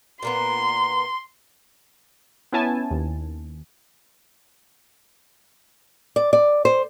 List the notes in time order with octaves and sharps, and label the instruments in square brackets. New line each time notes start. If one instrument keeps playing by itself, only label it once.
[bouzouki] A#2 A#3 B3 [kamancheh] C6
[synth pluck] B3 C#4 E4 G#5 A5
D#2
[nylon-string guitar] D5
D5
C5